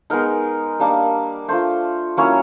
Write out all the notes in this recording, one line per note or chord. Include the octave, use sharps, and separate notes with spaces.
G#3 B3 D#4 A#4
G3 A#3 D4
A3 D4 F4 C5
F#3 A#3 C#4 E4 C#5